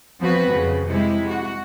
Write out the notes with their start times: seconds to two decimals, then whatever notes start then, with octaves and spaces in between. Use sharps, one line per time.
0.20 F3 B3 C4 F#4 B4
0.50 F2 C#3
0.89 C3 G#3 E4
1.29 F#4